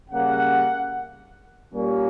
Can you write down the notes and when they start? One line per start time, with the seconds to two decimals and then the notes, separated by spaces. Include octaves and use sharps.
0.10 C#3 G3 A#3 F#5
1.73 A#2 G3 A#3 C#4